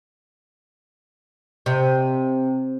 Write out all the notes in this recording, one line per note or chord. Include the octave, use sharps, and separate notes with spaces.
C3